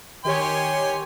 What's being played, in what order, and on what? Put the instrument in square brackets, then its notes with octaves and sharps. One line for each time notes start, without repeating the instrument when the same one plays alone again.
[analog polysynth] D#3 G4 C#5 [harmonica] G#5 C6